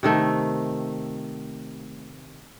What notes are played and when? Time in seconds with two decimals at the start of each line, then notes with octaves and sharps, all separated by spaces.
0.03 C3 D#3 A3